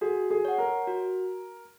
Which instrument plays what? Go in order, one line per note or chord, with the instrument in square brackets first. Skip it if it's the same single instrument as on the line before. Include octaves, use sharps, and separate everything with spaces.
[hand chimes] F#4 [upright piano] G#4
[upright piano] G#4
[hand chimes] C#5 F#5
[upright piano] A#4
[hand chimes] F#4